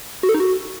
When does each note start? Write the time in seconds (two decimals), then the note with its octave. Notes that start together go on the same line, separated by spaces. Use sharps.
0.23 F#4
0.29 A4
0.34 D#4
0.40 F#4